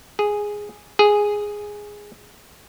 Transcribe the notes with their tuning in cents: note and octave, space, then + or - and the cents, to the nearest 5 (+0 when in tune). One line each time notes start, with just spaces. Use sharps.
G#4 -5
G#4 -5